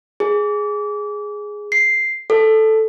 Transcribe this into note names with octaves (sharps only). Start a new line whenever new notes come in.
G#4
C7
A4